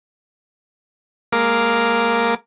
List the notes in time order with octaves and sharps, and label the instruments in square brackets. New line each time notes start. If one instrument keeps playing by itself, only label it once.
[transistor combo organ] G#3 A#3 A#4 F5 D6